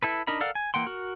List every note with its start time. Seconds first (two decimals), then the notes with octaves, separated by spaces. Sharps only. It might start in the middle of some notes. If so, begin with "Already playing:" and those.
0.03 E4 A4 B4
0.27 D4 D#4 A#4 D#5 B5
0.41 A4 A#4 D5 F5 F#5
0.55 G#5
0.74 E3 A#3 F#5 G5 C6
0.86 F#4 A#4